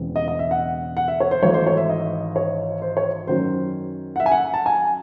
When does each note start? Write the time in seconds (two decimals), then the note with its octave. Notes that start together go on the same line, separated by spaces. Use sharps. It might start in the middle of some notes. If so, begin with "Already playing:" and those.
Already playing: E1 E2 C#3 G#3 C4
0.16 D#5
0.28 D#5
0.39 E5
0.51 F#5
0.97 F#5
1.08 E5
1.20 C#5
1.31 C5
1.42 G#1 G#2 E3 A3 C#5
1.54 C5
1.67 C#5
1.77 E5
1.90 D#5
2.36 C#5
2.82 C5
2.97 C#5
3.27 F#2 D#3 F#3 C#4 C5
4.16 F#5
4.20 E5
4.26 G#5
4.32 F#5
4.54 A5
4.66 G#5